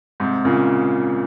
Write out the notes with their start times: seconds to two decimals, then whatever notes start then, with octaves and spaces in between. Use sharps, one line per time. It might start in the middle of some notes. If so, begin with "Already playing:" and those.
0.20 G#2 C3
0.45 A#2 C#3